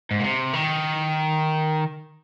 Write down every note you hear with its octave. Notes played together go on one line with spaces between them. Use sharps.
G#2
A#2
C3
D#3